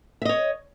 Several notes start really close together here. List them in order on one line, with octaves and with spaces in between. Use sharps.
E5 D#5 C#5